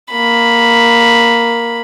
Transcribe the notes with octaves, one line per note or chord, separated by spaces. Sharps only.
A#3 B5